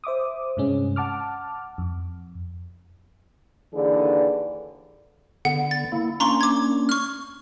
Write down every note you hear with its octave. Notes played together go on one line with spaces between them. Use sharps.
C5 E5 D6 D#6
G2 C3 G#3 C#4
F#5 A5 D6 F6
F2
D#2 D3 E3 D4 G#4 D5
D3 B3 F#5
A6
A#3 E4
A#3 C#4 D4 A#5 C6 C#6
D6 G#6
C#6 F6